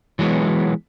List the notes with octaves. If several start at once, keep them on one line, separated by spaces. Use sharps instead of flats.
E3 F#3 G#3 B3